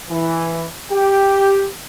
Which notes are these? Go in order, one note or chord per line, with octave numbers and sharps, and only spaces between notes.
E3
G4